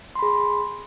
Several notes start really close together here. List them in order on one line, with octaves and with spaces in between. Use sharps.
C6 B5 G#4